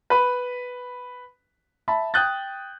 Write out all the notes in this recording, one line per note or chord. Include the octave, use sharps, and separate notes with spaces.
B4 B5
E5 A5 B5
G5 D#6 F#6 G6 A6